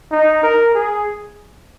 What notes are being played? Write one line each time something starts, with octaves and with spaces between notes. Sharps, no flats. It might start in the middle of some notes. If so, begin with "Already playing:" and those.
D#4
A#4
G#4